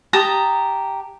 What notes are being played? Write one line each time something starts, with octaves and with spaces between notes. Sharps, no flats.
G4 A5 A#5 D#6